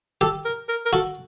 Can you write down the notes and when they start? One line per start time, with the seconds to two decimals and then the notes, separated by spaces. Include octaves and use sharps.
0.21 G4 A4
0.45 A#4
0.69 A#4
0.86 A#4
0.93 F#4 A4